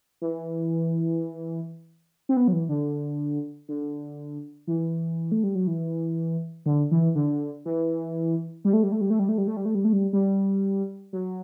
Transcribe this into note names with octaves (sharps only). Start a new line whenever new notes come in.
E3
C4
B3
F#3
E3
D3
D3
E3
A3
G3
F#3
E3
D3
E3
D3
E3
G3
A3
G3
A3
G3
A3
G3
A3
G3
A3
G3
A3
G3
A3
G3
G3
F#3